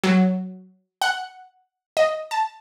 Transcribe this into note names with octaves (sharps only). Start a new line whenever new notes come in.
F#3
F#5
D#5
A5